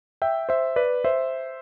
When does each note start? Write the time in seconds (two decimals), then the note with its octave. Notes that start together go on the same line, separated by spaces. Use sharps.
0.22 E5 G5
0.49 C5 E5
0.76 B4 D5
1.04 C5 E5